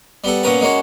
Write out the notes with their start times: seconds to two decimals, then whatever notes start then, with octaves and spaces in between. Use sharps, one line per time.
0.24 G3 B3 A4
0.43 A#2 B3 C#4 A#4 B4
0.61 G#3 A#3 C#4 F#4